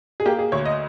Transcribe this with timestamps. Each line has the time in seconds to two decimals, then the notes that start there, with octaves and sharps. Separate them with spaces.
0.20 G#4
0.26 A#3 G4
0.38 G#4
0.52 D2 C#5
0.65 D#5